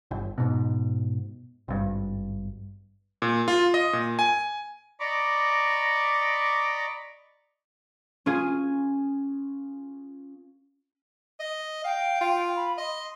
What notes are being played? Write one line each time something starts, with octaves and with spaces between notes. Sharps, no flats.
G1
G#2 B2
G#1 G2
A#2
F4
D#5
A#2
G#5
D5 D#5 A#5 B5 C#6 D6
C#4 F4 G#4
D#5
F5 G5
F4
B5
D#5 C6